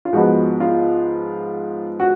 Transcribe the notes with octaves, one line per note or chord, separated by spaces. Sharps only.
F4
G#2 F3 G#3 B3 F#4
F4
F#4